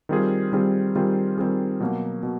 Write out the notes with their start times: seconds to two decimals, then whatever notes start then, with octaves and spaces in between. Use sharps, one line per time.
0.09 D#3 G3 C4 F4 G#4
0.53 D#3 G3 C4 F4 G#4
0.95 D#3 G3 C4 F4 G#4
1.38 D#3 G3 C4 F4 G#4
1.80 B2 F#3 A#3
2.23 B2